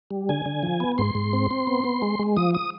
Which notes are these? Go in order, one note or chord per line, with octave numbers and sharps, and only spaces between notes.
G3
D3 G#5
D3
F3
B3
G#2 C6
G#2
C4
C4
B3
B3
G#3
G#3
F3 D#6
D#6